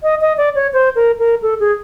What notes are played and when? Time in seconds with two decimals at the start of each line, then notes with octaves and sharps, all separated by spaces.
0.03 D#5
0.21 D#5
0.37 D5
0.55 C#5
0.73 C5
0.95 A#4
1.19 A#4
1.42 A4
1.60 G#4